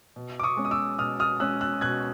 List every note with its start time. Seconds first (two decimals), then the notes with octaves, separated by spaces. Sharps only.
0.16 B2
0.39 D6
0.43 C#6 D#6
0.57 G#3 C#4
0.65 D#6
0.71 D6 E6
0.99 B2 D#6 F6
1.20 D#6 F6
1.40 G#3 C#4 E6 F#6
1.61 E6 F#6
1.81 B2 F#6 G#6